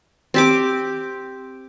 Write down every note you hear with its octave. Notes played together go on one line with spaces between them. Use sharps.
C4 G4 D6